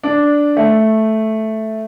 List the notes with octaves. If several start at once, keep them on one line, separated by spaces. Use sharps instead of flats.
D4
A3